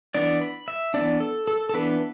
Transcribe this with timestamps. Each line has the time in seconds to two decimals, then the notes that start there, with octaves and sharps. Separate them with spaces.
0.14 E3 B3 D4 D5
0.41 B5
0.68 E5
0.94 E3 B3 D4 D5
1.20 A4
1.47 A4
1.69 A4
1.74 E3 B3 D4 B4